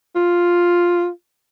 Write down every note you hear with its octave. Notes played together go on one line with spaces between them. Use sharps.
F4